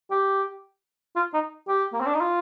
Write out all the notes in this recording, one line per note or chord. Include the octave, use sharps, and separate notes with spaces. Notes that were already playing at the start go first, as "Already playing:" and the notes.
G4
F4
D#4
G4
A#3
C4
D4
D#4
F4